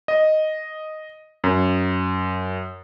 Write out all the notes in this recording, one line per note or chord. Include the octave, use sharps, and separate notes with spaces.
D#5
F#2